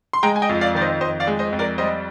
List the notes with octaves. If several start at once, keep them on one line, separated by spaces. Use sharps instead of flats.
C6
G#3 G5 A#5
G#5
D#5 G5
F2
D5 F5
D#3 D5
C5 D#5
F2 C5 D#5
D5 F5
G#3
C5 D#5
F2
A#4 D5
G3 C5 D#5